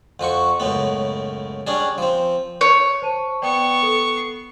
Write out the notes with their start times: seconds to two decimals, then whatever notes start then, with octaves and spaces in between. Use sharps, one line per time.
0.20 F2 F3 F#4 C#6
0.60 C#2 F#2 A2 B3
1.67 G3 C#4 D4 G#4
1.98 F3 C4
2.61 C#5
3.02 C5 A5 D#7
3.42 B3 D5 G5 C#6 D#6
3.83 A4
4.17 C7